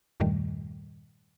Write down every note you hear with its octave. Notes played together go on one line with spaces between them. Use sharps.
E2 G2 A#2 D#3 G3 A3